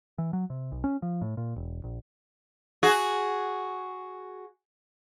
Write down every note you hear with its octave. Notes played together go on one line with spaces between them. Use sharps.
E3
F#3
C3
B1
C#4
F3
A2
A#2
E1
A#1
F#4 G#4